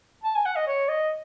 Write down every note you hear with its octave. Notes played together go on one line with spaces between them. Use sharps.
A5
G#5
F#5
D#5
C#5
D#5